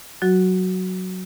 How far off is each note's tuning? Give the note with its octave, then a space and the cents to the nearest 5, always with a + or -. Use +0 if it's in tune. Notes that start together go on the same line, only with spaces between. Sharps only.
F#3 +0 F#4 +0